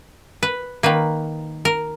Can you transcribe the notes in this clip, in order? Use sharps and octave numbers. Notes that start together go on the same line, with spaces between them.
B4
D#3 A#3 B4
A#4